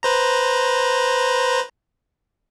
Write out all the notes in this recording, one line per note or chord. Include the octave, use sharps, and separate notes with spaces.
B4 C5 A#5